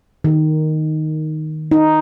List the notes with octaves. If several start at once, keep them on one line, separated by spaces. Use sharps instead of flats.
D#3
D#4